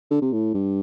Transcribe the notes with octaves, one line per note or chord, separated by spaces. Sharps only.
D3
C3
A2
G2